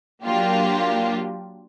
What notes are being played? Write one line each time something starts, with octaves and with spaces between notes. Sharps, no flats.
F#3 A#3 D4 F4 G4